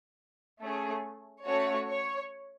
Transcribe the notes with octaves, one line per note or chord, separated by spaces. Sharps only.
A3 C#4 G#4
A3 C#4 F#4 C#5
C#5